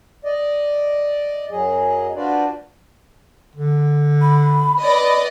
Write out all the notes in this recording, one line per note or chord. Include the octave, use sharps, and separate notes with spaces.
D5 D#5
F#2 F#3 G#4 D#5
D4 F4 F#4 B4 C5 D5
D3
B5
B4 D5 D#5